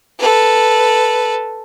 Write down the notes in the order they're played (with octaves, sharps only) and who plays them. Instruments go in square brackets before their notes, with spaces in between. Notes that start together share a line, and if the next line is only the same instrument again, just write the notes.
[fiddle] A4 B4